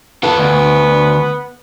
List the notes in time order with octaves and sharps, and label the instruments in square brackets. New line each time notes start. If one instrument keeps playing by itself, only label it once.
[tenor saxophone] B3 [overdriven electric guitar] F4 A4
[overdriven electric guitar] D2